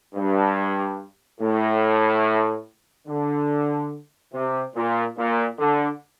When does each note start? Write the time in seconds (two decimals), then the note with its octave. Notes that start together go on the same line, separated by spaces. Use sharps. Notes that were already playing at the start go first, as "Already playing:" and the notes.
0.15 G2
1.40 A2
3.07 D3
4.33 C3
4.75 A#2
5.17 A#2
5.59 D3